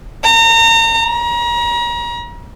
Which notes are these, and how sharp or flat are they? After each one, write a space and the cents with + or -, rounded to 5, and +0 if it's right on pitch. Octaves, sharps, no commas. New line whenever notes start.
A#5 -35
A#5 +35